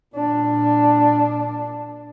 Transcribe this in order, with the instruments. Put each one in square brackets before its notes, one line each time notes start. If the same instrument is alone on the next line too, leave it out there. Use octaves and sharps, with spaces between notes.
[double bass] A#2 D4